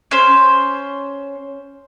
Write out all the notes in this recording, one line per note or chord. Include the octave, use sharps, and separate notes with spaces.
C#4 C5